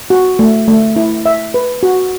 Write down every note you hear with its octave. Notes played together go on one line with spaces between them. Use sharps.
F#4
A3
A3
E4
E5
B4
F#4